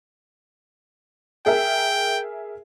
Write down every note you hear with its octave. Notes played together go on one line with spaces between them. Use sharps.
G#4 A#4 E5 G5